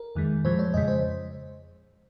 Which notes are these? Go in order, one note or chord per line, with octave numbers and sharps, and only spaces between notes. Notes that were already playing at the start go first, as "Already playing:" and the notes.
Already playing: A#4
F2 D#3 G#3
A#2 F3 G#3 C5
C#5
F2 C#3 G#3 D#5
C5